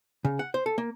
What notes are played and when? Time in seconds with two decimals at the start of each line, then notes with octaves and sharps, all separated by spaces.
0.25 C#3
0.39 F#5
0.54 C5
0.66 A4
0.78 A#3